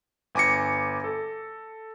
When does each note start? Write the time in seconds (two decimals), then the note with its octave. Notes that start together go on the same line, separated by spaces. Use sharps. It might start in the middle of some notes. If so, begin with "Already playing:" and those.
0.35 G1 G#5 D6 A#6 C#7
1.04 A4